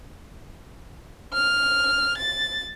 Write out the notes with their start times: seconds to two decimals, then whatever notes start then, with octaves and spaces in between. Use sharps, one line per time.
1.34 F6
2.17 A6